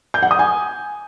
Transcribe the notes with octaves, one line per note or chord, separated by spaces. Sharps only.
G6
F#5
D#6
G#5